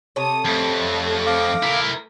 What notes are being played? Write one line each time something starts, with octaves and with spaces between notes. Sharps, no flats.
C3 A4 C#5 D#6
F2 A3 A#6
F5 D6
E4 A#4